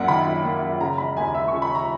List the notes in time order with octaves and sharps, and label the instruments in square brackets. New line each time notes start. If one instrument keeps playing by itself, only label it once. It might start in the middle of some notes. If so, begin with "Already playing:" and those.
Already playing: [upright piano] A#1 F#2 A#3 E5 F#5
D#3 B5
F#2
A#3
F#2
C#3 A#5
E1 B5
D#2 G#5
E1 E5
C#6
C#3
B5
E1 A#5